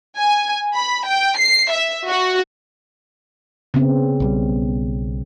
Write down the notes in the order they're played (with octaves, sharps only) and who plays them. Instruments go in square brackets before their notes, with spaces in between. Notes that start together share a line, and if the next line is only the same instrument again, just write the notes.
[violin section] G#5
B5
G5
C7
E5
F#4
[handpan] C#3 B3 C4
[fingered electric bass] B1 B2 G3